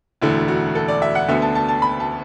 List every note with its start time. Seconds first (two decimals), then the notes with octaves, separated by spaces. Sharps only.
0.22 E1 D2 D3 A3 E4
0.48 F#4
0.75 A4
0.88 D5
1.02 E5
1.15 F#5
1.28 D2 D3 B3 E5
1.42 A5
1.55 A5
1.68 A5
1.82 B5
2.00 A5